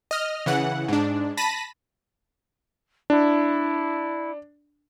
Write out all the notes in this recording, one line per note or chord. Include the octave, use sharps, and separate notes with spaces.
D#5 F6
C#3 E3 F#5
G#2 D4
A5 B5 A#6 B6 D#7
D4 E4